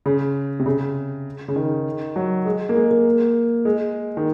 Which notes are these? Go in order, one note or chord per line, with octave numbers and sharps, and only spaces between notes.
C#3
C3
C#3
C#3
D#3
F#3
G#3
A#3
G#3
A#3
G#3
D#3